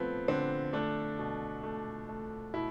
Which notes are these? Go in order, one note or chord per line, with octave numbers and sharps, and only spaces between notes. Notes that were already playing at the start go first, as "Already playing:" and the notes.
Already playing: F3 A3 B3 C4
D3 C4
A3 D4
B2
A3
A3
B2 E4